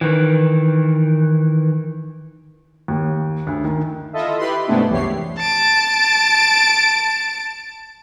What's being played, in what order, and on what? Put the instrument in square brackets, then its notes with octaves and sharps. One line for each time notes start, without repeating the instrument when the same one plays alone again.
[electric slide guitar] D#3 E3
[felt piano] D#2
D2
D#3
[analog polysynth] E4 F4 A4 D#5 E5
E4 G4 B4 B5 C6
G#2 C3 A3 B3 D4 E4
C2 F#2 E3 G4 C#5 C7
[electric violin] A5 D7